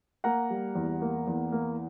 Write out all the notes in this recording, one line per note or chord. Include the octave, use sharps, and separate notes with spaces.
A#3 F#5 A#5
G3
E2
A#3
E2
A#3